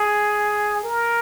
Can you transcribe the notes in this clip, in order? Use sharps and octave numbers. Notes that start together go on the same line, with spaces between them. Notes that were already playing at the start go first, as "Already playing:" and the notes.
Already playing: G#4
A#4